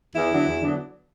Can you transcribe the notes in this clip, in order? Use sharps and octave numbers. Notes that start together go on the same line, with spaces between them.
E2 E4
D3 F#3 B3 D4
E2
D3 F#3 B3 D4